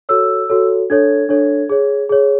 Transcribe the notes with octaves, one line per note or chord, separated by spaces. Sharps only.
F#4 A4 C#5 E6
F#4 A4 C#5
D4 A4 C#5 G#6
D4 A4 C#5
G#4 C#5
G#4 C#5